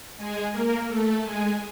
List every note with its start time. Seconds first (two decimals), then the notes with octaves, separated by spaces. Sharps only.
0.17 G#3 G#4
0.53 A#3 A#4
0.88 A3 A4
1.23 G#3 G#4